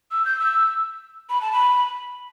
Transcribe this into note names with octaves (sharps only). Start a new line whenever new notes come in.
E6
G6
E6
B5
A5
B5